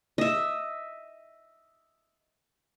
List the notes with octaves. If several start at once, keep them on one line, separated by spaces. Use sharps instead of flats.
D#5 E5